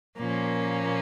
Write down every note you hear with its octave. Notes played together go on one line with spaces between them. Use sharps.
A#2 F3 A#3 C#4